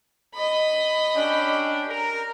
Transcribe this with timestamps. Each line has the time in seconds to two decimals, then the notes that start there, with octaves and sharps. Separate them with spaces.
0.35 D#5 B5
1.16 C#4 D4 G4
1.89 A#4